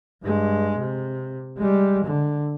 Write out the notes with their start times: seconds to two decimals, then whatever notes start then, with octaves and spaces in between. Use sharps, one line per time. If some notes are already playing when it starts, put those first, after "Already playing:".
0.23 G2 G#3
0.77 C3
1.57 G3 G#3
2.05 D3